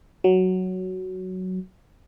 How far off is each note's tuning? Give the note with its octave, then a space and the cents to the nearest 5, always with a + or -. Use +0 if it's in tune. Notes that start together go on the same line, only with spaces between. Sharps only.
F#3 +5